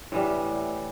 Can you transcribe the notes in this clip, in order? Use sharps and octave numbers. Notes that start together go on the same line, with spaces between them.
A2 E3 G3